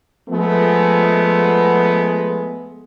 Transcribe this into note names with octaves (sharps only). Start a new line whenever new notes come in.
F3 G#3 A3 B3